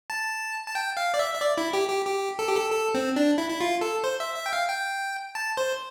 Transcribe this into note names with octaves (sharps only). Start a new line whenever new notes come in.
A5
A5
G5
F5
D5
E5
E5
D5
E4
G4
G4
G4
A4
G4
A4
A4
C4
D4
E4
E4
F4
A4
C5
E5
E5
G5
F5
G5
A5
C5